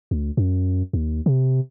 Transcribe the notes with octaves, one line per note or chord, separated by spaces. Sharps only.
D2
F#2
D#2
C3